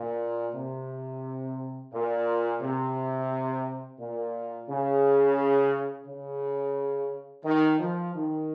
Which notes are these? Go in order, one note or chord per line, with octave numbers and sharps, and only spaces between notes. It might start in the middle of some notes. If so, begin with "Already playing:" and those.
Already playing: A#2
C3
A#2
C3
A#2
C#3
C#3
D#3
F3
D#3